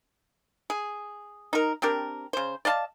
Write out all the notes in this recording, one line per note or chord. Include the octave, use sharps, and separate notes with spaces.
G#4
D#4 A#4
C4 D4 G4 A#4
C#3 C5
D5 D#5 F5 A5